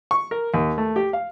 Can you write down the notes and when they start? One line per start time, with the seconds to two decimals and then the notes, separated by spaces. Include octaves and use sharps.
0.11 C#6
0.31 A#4
0.54 D#2
0.78 A3
0.96 G4
1.13 F5